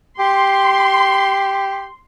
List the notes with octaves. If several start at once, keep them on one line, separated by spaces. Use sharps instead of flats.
G4 C6